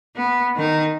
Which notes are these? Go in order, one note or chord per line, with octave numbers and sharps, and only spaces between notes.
B3
D#3 D#4